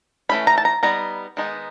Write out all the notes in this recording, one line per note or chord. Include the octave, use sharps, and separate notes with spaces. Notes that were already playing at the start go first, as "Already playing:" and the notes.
E3 A3 C#4 B5
A#5
A5
A#5
G3 B3 D#4 A#5
D#3 G#3 B3 D#4